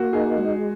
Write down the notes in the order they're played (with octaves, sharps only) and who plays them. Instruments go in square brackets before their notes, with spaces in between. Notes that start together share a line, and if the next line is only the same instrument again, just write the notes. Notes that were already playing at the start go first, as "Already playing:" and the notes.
Already playing: [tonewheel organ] A#3 [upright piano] F#4
[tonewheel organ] D#4 [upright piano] G#4
[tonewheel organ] G#3